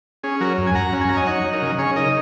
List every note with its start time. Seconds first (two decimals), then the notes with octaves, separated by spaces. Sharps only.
0.23 C#4 G#4
0.41 F#3 F#4 A#4
0.58 F#2
0.67 G#5
0.75 F#2 F#5 A#5
0.93 C#4
1.01 G#5
1.09 F#3 A#5
1.17 D#5 G#5
1.27 D#4 C#5 F#5
1.44 F#3
1.53 A#4 D#5
1.62 C#3
1.78 C#3 G#4 C#5
1.96 D#4 A#4 D#5